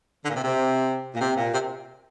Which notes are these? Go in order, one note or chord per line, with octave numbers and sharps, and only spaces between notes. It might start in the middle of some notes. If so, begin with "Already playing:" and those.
D3
A#2
C3
C3
A#2
C3
A#2
C3